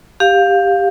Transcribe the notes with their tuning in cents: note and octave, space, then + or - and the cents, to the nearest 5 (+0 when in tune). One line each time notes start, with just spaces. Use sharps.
G4 +10 F5 +10